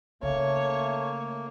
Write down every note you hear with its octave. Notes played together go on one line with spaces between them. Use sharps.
C#3 A3 A#3 C#5